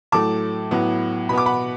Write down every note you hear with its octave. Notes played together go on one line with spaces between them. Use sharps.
A2 F#3 A3 A5 D6
A2 F#3 B3
B2 B3 B5 D6
F#5 B5